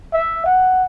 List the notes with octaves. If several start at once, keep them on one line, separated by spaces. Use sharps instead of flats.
E5
F#5